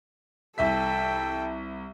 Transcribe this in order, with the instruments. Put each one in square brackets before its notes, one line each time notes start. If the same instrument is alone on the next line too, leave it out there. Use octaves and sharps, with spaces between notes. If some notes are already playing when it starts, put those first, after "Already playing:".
[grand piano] C2 E5 B6 [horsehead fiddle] A4 G5